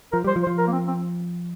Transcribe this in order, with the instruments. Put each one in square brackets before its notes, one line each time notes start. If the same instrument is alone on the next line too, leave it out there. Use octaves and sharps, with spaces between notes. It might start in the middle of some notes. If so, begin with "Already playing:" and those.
[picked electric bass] F3 [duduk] A#4
[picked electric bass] G3 [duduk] C5
[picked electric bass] F3
[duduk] C5
[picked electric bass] F3
[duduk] A#4
A#3
C4
C4